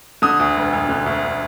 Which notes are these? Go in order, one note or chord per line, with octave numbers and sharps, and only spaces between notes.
D3 D#6
D2
E1
E1
D3
D2